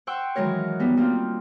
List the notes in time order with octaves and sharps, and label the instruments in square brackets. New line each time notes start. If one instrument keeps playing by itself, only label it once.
[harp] C5 F#5 G5 C#6 E6
D#3 E3 F#3 G#3 A#4 C#5
G3 B3 D#4
G3 A#3 C4 F4